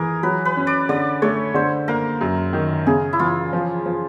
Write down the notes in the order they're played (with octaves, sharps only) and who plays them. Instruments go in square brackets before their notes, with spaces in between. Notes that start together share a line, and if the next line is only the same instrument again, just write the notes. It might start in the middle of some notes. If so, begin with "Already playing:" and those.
Already playing: [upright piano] E3 [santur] G#4 A#4
[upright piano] F#3 [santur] B4
[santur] B4
[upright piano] C#4
[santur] D5
[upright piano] D3 [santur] D5
[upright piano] A3 [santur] C#5
[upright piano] D3 [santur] C5
[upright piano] A#3 [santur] A#4
[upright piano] F#2
D#3
[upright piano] C#3 [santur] G#4
[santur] E4
[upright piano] E3 [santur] F4
[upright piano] F3
F3